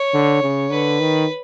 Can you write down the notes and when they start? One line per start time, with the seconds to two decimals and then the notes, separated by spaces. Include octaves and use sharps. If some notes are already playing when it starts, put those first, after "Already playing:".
Already playing: C#5
0.14 D3
0.42 C#3
0.71 D3 B4
1.00 D#3